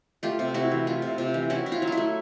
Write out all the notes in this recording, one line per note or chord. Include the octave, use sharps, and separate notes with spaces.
A3 F4 G4
C3
C3 E4 F#4
E3
A3 F4
C3
C3 F4
E3
C#4 E4 F#4
E4
F4
F#3
E4 F4
A3